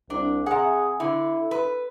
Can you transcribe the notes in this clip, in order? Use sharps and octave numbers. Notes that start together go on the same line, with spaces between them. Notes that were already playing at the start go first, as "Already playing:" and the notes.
C2 D4
C3 G#4 F#5
D3 E4
B4